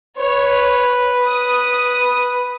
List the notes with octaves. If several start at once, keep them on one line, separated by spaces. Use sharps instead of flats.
B4 C#5
D#6